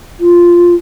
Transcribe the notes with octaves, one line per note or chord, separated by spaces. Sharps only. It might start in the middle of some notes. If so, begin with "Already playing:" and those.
F4